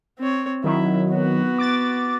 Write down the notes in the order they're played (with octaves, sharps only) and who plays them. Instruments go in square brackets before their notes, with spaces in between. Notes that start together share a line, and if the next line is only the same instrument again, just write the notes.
[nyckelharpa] C4 C#5
[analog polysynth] D#3 F#3 [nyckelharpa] E4
[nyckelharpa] B3 F#4
[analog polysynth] D6 A6